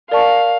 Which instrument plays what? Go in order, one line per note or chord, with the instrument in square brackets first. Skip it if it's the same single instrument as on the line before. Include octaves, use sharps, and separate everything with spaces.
[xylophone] A#4 D5 A5 C#6 [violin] F5